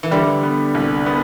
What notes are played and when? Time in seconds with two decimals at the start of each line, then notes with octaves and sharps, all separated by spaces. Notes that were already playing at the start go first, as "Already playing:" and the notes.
0.03 E3
0.11 D3 G3
0.43 B3
0.75 C2
1.06 B3